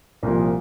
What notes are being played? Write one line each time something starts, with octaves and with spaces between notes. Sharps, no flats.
C2 A#2 F3